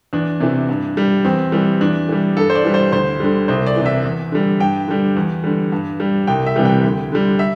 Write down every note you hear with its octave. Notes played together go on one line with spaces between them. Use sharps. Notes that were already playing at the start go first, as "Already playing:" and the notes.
E2 D4
C3 E3
G2
G3
E2 C4
E3 G3
E2 D4
E3 G3
G2 A4
C5
D5
E3 G3
C5
D2 C5
D3 G3
C2 C5
D5
C3 E3
E5
E2
D3 G3
G2 G5
D3 G3
E2
D3 G3
G2
G3
C2 G5
E5
C3 E3 G3
G5
D2
D3 G3
E5